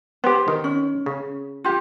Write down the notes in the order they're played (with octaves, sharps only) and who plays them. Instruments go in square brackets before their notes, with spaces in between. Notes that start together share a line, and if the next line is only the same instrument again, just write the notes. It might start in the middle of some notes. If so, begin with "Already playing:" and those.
[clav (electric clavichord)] B3 G4 [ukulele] C5
[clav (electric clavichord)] D#3
[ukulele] C#4
[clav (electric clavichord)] C#3
[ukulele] F4 G4